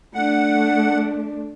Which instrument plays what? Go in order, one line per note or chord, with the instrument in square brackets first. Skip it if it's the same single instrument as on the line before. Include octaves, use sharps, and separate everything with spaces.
[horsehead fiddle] A3 D4 [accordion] F#5